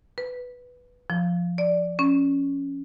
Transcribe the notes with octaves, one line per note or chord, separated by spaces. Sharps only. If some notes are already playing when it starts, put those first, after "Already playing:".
B4
F3
D5
C#4